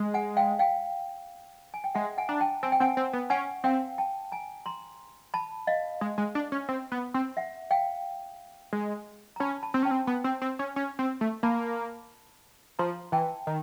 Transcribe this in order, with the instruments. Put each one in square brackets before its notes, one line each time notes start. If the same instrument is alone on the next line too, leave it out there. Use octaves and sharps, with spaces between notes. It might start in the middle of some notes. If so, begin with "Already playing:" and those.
Already playing: [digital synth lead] G#3
[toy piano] F#5 G#5
F5 G5
F5 G5
G#5
G5
[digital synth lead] G#3 [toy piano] E5 F#5
[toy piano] F#5 G#5
[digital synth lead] D4 [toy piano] A#5
[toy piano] G5 A5
[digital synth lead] C4 [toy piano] G#5
[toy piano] G5
[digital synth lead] C4 [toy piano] F#5 G#5
[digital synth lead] C4
B3
[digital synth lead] C#4 [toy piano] F#5 G#5
[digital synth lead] C4 [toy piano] F5 G5
[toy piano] G5 A5
G#5 A#5
A#5 C6
A5 B5
D#5 F5
[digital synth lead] G#3
G#3
D4
C#4
C4
B3
C4
[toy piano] E5 F#5
F5 G5
[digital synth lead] G#3
[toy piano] A#5
[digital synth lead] C#4 [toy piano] A5 B5
[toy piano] A5 B5
[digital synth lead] C4
[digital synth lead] C#4 [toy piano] G5 A5
[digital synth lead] C4
B3
C4
C4
C#4
C#4
C4
A3
[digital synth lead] A#3 [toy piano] A5 B5
[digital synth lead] F3 [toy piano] A#5 C6
[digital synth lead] E3 [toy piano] G5 A5
[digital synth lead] D#3